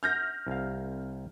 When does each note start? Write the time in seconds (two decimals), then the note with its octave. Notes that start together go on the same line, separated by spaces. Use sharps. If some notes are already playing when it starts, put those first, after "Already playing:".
0.03 F6 G6 A#6
0.47 C2 F5